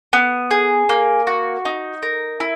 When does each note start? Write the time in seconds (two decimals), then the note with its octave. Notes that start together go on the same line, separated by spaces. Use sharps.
0.13 B3
0.51 G#4
0.89 A#3
1.27 F#4
1.65 D#4
2.03 A#4
2.40 E4